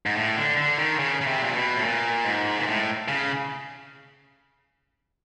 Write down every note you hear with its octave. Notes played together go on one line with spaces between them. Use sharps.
G#2
A2
D3
D3
D#3
C#3
C#3
C3
A#2
B2
A2
A#2
G#2
A#2
A2
C#3